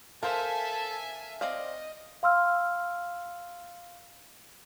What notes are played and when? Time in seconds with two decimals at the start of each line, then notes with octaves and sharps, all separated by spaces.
0.23 A4 A#4 C5 E5 F5 G#5 A5
1.41 C4 D5 D#5 F5
2.23 F5 C6 E6 F6